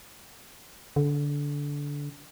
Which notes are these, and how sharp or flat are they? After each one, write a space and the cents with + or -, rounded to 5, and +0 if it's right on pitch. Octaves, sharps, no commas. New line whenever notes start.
D3 -20